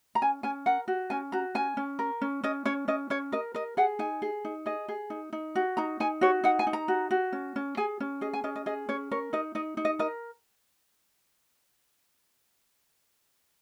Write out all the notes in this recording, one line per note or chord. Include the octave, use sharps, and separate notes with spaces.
A#5
C#4 G#5
C#4 G#5
A#4 F#5
F#4
C#4 G#5
F#4 A#5
C#4 G#5
C#4
A#4
C#4
C#4 D#5
C#4 C#5
C#4 D#5
C#4 C#5
A#4 D#5
A#4 D#5
G#4 F#5
D#4 G#5
G#4
D#4
G#4 D#5
G#4
D#4
D#4
F#4
D#4 A#5
D#4 G#5
F#4 C#5
D#4 F#5
G#5
D#4
A#5
F#4
F#4
C#4
C#4
G#4 G#5
C#4
G#4 D#5
G#5
C#4 D#5
D#5
G#4 D#5
C#4 C#5
A#4 C#5
D#4 D#5
D#4 D#5
D#4
D#5
A#4 D#5